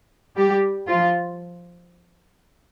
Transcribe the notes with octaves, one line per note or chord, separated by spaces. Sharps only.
G3 G4
F3 F4